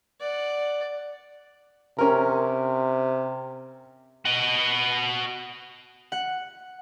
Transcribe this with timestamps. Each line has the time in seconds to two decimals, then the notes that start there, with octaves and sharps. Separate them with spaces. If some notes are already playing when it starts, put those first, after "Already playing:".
0.20 D5 F#5
1.99 C3 C#4 A#4
4.25 F#4 D#5
6.12 F#5